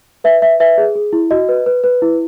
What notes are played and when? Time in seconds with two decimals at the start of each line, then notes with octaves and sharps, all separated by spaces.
0.24 B4 E5
0.42 B4 E5
0.60 B4 E5
0.78 G#4
0.96 G#4
1.13 E4
1.31 F#4 D#5
1.49 B4
1.66 B4
1.84 B4
2.02 E4